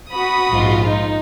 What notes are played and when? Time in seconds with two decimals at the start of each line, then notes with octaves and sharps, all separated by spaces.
0.12 F#4 B5 D#6
0.51 A#1 G#2 F4
0.85 D#4